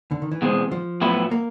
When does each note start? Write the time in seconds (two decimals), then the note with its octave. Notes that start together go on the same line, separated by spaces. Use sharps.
0.11 D3
0.22 D#3
0.32 E3
0.42 B2 G#3 C4
0.71 F3
1.01 A2 F#3 B3 E4
1.31 A#3